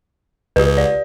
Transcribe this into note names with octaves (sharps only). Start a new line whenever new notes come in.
C#2 G4 B4
D5